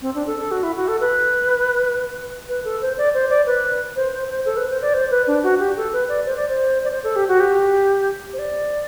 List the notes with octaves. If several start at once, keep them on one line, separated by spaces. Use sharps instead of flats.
C4
D4
A4
A4
F#4
E4
F#4
A4
B4
B4
A4
C5
D5
C5
D5
B4
C5
C5
C5
A4
B4
C5
D5
C5
B4
D4
F#4
G4
A4
B4
D5
C5
D5
C5
D5
C5
A4
G4
F#4
G4
C5
D5